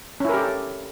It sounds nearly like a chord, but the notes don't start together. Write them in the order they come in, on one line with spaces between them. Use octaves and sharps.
C#4 E4 A#4 G4 A4